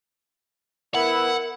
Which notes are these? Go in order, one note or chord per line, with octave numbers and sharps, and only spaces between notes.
B3 E4 A#4 F#5